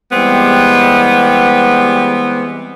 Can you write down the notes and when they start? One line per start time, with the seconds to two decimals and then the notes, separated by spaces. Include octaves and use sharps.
0.12 E3 G3 G#3 B3 C4 G4